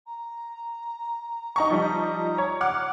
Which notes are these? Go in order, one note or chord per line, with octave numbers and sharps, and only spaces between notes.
A#5
D#4 F#5 A#5 C#6
F3 G3 D#4 A#5
C#5
F#5 D6 F6